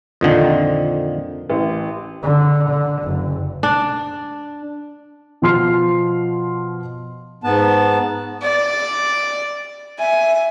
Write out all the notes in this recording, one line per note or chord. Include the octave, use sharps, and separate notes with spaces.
F2 A#2 D3 D#3
A1
D3
D3
F#1
D4
B2 F3 C6 F6 C7
G#2 B3 A5
D5
E5 G#5